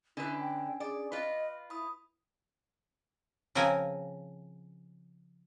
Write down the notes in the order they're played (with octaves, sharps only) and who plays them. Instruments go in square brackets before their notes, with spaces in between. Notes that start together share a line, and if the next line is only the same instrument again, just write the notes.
[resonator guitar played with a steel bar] D3 B4 [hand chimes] C#4 D4 G#5 [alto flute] E4
[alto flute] G5
[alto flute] G#4 [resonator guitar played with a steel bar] D5
[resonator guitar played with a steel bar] F4 B4 [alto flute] D#5
[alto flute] E4 [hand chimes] B5 D#6
[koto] C#3 F3 C4 A#4 G#5